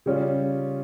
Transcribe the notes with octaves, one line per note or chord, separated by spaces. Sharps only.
C#3 G3 C#4 F4